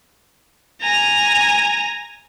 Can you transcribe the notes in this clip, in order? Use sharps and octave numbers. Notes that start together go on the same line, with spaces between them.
G#5 A#5